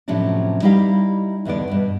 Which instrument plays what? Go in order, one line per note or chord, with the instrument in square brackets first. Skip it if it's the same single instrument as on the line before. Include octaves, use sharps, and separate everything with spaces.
[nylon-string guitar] A2 C3 F3 F#3 C#4 D4
G3 D#4 E4 G4 D#5 F5
E2 B2 D3 B3 D5
G2 B2 D4